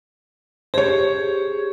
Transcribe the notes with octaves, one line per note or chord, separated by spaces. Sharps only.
G4 G#4 C5 C#5